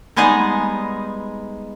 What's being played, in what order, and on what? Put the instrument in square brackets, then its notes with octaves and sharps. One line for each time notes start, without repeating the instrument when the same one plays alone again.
[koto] G3 G#3 B3 D#4 G#4 D#5